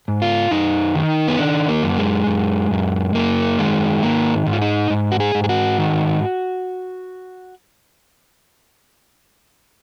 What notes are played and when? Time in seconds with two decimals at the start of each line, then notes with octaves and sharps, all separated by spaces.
0.08 G#2
0.22 F4
0.51 F#2 D#4
0.95 D#3
1.28 B3
1.39 D#3 D4
1.68 A#3
1.83 F#2
1.98 G#3
2.27 F#2
2.71 F#2
3.15 F#2 A#3
3.59 D#3 G#3
4.02 G#2 A#3
4.47 G#2
4.53 F4
4.62 D#4
4.90 G#2
5.12 F#4
5.20 G#4
5.35 G#2
5.44 G#4
5.49 F#4
5.79 D#3